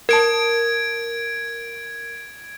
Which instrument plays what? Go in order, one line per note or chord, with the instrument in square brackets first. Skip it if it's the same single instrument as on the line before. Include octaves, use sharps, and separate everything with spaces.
[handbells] A#4 A5 [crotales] G#6 D7